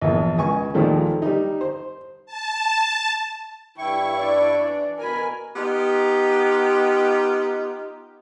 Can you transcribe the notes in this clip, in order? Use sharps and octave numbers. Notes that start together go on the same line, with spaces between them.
A#1 E2
C#2 G#5 C#6
D#2 A#2 D#3 F3 G#3 A3
G3 D#4
C5
A5
G2 E4 G5 C#6
D4 D5
E3
B2 A#4 G#5 B5
B3 D#4 F4 G4